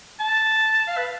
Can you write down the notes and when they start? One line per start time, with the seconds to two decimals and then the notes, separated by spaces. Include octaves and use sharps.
0.20 A5
0.88 F5
0.97 B4